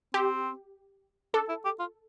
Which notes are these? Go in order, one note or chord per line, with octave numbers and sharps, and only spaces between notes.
C4 G4
D4 A4
E4
G4
F4